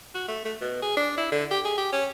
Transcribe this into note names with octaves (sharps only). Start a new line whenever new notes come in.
F#4
A3
A3
B2
G#4
D4
E4
D3
G4
G#4
G4
C#4